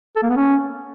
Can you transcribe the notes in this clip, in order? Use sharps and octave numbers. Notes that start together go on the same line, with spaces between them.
A4
A#3
B3
C#4